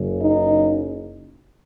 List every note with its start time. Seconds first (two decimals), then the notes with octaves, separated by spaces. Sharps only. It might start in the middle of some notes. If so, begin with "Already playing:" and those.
Already playing: F#1 F#2 C#3
0.18 D#4